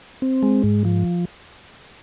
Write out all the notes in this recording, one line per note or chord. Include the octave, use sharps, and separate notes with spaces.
C4
G#3
G#2
F3